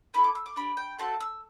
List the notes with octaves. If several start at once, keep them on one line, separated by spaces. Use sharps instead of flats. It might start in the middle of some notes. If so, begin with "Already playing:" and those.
B3 E4 A4 B5
D6
E6
D6
D4 G4 B5
G5
A3 C4 F#4 A4 A5
E6